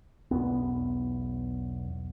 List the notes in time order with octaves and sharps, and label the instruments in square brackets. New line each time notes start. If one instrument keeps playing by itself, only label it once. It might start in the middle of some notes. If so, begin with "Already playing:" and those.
[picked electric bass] B1 E2 B3